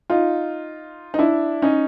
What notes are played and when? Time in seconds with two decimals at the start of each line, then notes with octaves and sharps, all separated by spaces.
0.10 D#4 F4
1.14 D#4
1.19 D4 E4
1.62 C#4 D#4